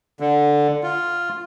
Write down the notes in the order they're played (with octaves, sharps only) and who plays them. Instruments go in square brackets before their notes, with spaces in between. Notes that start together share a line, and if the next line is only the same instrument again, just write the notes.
[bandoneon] D3
F4